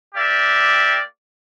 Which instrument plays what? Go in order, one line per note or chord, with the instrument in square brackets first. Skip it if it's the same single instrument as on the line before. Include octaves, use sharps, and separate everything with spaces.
[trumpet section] A#3 G4 D5 E5